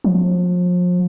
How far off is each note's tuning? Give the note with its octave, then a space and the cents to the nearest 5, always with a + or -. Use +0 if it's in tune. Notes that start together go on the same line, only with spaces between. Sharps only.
F3 +35